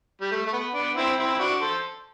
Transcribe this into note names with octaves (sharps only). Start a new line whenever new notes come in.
G3
A3
A3
B3
B3 D4
C4 E4
C4 E4
E4
D4 F#4
A4 C5